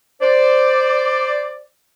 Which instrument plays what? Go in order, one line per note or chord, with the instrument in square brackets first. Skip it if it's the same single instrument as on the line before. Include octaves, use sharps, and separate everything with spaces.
[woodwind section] C5 D5